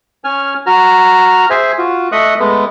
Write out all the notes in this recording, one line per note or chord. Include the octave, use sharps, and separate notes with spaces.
C#4 G#5 F6
F#4 A#5 F6
G#4 C5 E5 G#5
F4 F#4
A3 D#5 E5 C#6 D#6 F#6
G#3 A3 B3